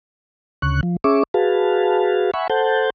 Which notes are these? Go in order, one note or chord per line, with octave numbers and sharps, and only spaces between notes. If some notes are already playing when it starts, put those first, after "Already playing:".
D2 C#3 C#6 F#6
F3
C#4 G#4 E5 C#6 D6
F#4 G#4 B4 F5 A5
E5 F#5 G#5 B5 C#6
A4 C5 F#5 A5 G6